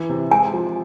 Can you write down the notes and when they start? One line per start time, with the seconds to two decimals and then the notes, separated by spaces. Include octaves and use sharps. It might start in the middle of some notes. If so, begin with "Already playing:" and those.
Already playing: E3
0.09 C3
0.31 G#3 G#5
0.53 F3